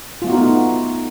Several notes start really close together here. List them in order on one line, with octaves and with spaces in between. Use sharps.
F4 A3 B3 F#4 D#4